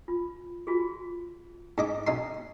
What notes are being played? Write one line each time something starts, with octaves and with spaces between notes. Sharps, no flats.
F4
F4 F#4 G#4
G#2 D#5 D6
B1 D#4 C6